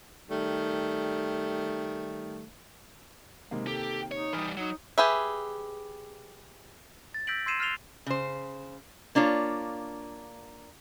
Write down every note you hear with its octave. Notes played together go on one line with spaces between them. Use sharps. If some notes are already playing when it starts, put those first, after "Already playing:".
D#3 G3 A3
C3 D#3 G#3 A#3
G4 A4
D#4 C#5
E3 G3 B5 D#6 F6
F#3 D#4
G4 G#4 B4 E5
A6
E6 G6 A#6 B6 D7 F#7
C6 E6 G#6 C7 D#7 E7
F6 F#6 A6 C7 F7 G7
C#3 C5
A#3 D4 F4 C#5